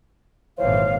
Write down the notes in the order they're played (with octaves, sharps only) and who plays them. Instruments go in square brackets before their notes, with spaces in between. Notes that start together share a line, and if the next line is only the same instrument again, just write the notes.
[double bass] G#1 A#2 [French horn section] E3 F3 C5 [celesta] C#5 [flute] F5